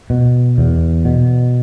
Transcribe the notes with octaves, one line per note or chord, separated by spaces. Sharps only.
B2
E2
B2